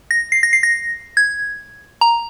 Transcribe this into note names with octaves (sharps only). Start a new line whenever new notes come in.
A#6
C7
A#6
C7
A#6
G#6
A#5